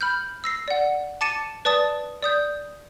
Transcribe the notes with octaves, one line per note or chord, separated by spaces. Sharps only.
B5 F6 G6
E6 A#6 C7
D5 F#5
A5 D6 A6 C#7 D#7 E7
B4 D5 A5 D#6 A6
D5 D#6 G6